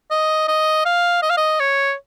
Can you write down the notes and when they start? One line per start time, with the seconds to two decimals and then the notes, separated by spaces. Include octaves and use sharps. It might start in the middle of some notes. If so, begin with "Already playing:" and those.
0.11 D#5
0.48 D#5
0.85 F5
1.22 D#5
1.30 F5
1.37 D#5
1.60 C#5